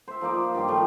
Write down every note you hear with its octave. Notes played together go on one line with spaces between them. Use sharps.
C5 E5
F3 A#3 D#4 D5
G2 D#3 G4 C6
F3 G3 A3